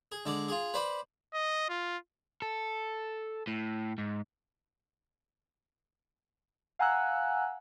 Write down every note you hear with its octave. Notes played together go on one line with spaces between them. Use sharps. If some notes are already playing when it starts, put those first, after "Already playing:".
G#4
D3 G#3 D5
F4 G#4
B4 C5 D5 B5
D#5
F4
A4
A2
G#2
F5 F#5 G#5 A#5 E6 F#6